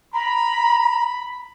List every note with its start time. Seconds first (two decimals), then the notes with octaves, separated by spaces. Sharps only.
0.13 A#5 B5